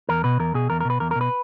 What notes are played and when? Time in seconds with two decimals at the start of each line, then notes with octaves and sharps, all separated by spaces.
0.09 E2 A#4
0.24 B2 B4
0.40 E2 A#4
0.54 B2 G#4
0.70 E2 A#4
0.81 A#4
0.85 B2 B4
1.00 E2 A#4
1.11 A#4
1.16 B2
1.21 B4